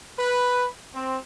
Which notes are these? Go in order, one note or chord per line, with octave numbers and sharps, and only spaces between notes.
B4
C4